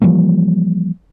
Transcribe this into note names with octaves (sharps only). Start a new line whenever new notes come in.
E3 F3 G3 A#3